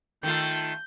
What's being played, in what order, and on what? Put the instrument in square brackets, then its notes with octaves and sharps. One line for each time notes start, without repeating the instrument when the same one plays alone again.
[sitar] D#3 A3 F4 [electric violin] G6